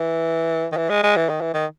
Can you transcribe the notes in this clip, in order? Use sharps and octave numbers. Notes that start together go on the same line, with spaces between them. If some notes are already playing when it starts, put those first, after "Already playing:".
Already playing: E3
D#3
E3
G#3
G#3
E3
D#3
E3
D#3